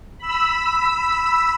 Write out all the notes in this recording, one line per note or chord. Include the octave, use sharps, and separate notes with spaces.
B5 E6